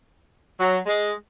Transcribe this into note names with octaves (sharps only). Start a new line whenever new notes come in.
F#3
G#3